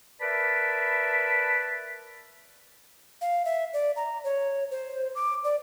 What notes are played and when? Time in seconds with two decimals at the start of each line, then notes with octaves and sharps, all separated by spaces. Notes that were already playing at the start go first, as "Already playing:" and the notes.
0.21 A#4 B4 D5 E5 A5 B5
3.21 F5
3.45 E5
3.73 D5
3.96 A#5
4.24 C#5
4.71 C5
5.15 D6
5.44 D5